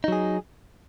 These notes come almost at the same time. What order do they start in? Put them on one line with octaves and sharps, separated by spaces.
D#4 F#3 G#4